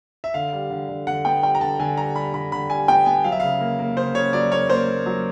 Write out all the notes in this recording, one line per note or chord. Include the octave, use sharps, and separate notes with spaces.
E5
D3 F5
G3
D3
D3
D3 F#5
B3 G5
G3 G5
A#5
D3 A5
D3 G#5
G3 A#5
G3 B5
D3 B5
D3 B5
G3 G#5
B3 G5
B3 G#5
F#3 F5
E5
C#3 F5
A#3
A#3
C#3 C5
C#3 C#5
F#3 D5
A#3 C#5
A#3 C5
A#3
F#3